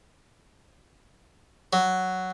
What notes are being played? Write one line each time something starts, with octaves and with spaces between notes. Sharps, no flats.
F#3